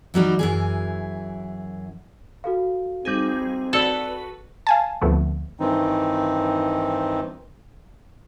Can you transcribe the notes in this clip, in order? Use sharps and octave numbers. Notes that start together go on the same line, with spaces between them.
E3 F#3 G3 D#4
F#2 E3 G#4
F#4 A4 F5
G3 C4 D#4 G#4
F#4 A4 B4 D5 E6 C#7
F5 G#5 A5
D2 F3 A3 B3 C4
G2 D#3 E3 C4 D#4